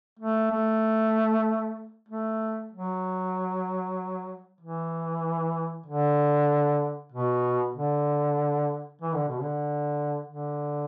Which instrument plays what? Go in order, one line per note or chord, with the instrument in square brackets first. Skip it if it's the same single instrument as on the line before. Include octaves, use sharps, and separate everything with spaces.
[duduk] A3
A3
A3
F#3
E3
D3
B2
D3
E3
D3
B2
D3
D3